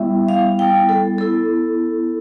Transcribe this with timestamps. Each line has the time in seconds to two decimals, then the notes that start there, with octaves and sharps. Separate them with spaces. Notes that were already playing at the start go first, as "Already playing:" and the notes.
Already playing: G3 B3 E4 E5
0.29 F5
0.59 G5
0.89 A4
1.18 B3 E4 A4